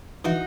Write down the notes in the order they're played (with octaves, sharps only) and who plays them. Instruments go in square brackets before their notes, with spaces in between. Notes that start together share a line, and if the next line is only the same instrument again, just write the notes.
[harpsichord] E3 [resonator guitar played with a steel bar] D#4 F#4